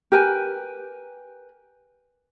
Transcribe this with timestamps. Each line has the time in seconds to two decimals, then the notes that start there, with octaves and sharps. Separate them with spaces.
0.12 G4 A#4 B4 G#5